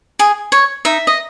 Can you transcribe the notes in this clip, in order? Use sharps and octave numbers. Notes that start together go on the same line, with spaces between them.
G#4
C#5
D#4 E5
D#5